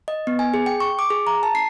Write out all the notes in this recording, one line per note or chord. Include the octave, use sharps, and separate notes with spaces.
D#5
B3
G#5
G#4
G5
C#6
D6
G#4
A#5
A5
C7